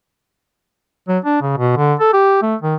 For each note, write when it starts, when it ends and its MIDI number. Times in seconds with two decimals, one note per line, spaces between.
1.08 1.18 54
1.25 1.41 62
1.42 1.56 49
1.57 1.74 47
1.77 1.94 50
2.00 2.12 69
2.13 2.39 67
2.42 2.55 57
2.62 2.75 51